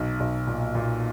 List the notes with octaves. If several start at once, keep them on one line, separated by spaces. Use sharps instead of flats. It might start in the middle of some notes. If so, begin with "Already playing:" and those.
Already playing: B1
B1
A#2
A#2